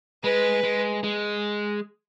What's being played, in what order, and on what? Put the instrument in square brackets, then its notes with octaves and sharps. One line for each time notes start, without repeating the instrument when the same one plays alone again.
[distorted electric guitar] G#3 [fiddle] B4
[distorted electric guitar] G#3
G#3